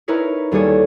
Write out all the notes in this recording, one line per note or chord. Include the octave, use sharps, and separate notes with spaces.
C#4 D#4 E4 A#4 B4 C#5
D#2 G3 D4 G#4 A4 C#5